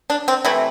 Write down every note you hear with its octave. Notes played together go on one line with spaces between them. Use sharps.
D4
C4
C3 E3 A3 E4